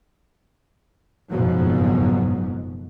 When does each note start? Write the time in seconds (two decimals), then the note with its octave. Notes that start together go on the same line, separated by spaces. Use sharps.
1.30 F#1 F2 G#2 B2 F3 F#3